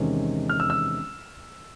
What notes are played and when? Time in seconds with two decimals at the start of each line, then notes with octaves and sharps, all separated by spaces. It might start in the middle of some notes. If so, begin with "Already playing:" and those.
Already playing: E2 C3 D#3 G#3 C#4
0.49 F6
0.60 E6
0.70 E6